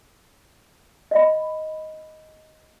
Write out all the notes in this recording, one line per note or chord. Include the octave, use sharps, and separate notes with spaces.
D#5 F5 B5